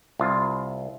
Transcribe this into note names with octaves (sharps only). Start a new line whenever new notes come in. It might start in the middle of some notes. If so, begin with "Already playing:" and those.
C2 F4